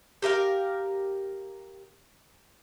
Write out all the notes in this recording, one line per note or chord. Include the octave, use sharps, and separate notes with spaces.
G4 A#4 E5 F5